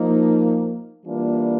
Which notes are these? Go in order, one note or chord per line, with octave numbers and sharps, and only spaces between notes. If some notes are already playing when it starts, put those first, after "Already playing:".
Already playing: F3 A#3 D#4
E3 G3 A#3 D4 F4